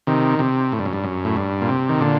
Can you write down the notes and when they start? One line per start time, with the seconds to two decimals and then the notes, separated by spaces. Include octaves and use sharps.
0.07 C3 D#3
0.39 C3
0.72 A2
0.79 G2
0.86 F#2
0.93 G2
1.04 F#2
1.25 A2
1.36 G2
1.61 A#2
1.69 C3
1.89 D#3
2.01 A#2 D3